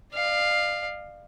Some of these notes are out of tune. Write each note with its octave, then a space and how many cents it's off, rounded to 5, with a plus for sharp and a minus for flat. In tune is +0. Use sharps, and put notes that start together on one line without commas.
D5 +40 F5 +0